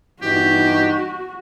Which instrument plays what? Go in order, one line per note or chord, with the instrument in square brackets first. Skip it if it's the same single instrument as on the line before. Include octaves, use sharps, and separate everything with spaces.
[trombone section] E2 G2 D#4 [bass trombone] E3 [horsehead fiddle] F#4 [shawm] G4